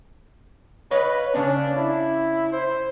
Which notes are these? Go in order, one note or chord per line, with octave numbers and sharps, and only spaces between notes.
B4 C#5 D#5 F5
C#3 C#4 D4
E4
C5